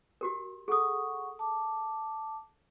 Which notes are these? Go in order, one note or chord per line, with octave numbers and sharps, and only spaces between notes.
F#4 G4 A#4
G#4 A4 F#5 C#6 D#6
A5 D6